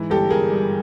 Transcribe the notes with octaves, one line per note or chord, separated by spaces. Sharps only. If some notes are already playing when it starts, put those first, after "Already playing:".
Already playing: G#2 E3
G1 G4 A4
G1 G#4 A#4
G2